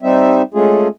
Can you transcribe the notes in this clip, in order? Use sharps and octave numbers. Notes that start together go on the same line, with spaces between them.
G3 C4 D#4 E5
G#3 A3 C#4 F4 G#4